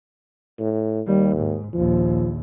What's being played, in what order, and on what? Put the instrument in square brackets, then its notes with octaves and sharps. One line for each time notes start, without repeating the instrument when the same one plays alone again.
[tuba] A2
[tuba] D#2 [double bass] G3
[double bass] G#2
[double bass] A#1 D#2 [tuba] F3